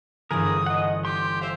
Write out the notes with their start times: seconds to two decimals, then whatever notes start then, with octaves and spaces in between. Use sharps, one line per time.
0.31 G1 E3 G#4 A#4 D#6
0.66 D#5 F#5
1.05 G4 C6
1.41 C5 E5 F5